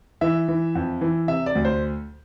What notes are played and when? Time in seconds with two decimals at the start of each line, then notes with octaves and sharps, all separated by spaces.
0.21 E3 E5
0.48 E3
0.75 F2
1.01 E3
1.28 C3 E5
1.46 D5
1.55 D2
1.65 C5